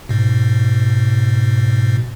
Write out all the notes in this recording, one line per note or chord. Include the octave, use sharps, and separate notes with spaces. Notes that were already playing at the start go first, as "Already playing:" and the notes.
G#2 B2